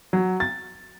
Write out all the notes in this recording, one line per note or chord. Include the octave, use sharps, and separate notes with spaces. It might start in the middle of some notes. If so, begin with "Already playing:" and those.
F#3
A6